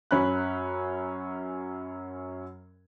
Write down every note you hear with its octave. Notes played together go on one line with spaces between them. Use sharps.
F#2 C#4 B5 F#6